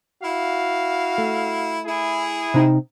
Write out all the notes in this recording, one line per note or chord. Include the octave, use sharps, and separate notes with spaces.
E4 F#4 F5
A3
E4 G#4
C3 D#4 G5